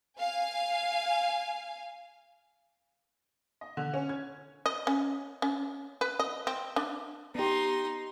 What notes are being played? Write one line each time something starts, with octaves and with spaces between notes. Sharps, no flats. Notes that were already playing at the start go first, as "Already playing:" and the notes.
F5 G#5
D#5
D3
C#4
G#6
D#5
C#4
C#4
B4
D#5
C4
D4
B3 D#4 G4 C6